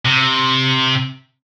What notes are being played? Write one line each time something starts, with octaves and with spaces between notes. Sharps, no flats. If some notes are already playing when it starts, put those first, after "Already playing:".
C3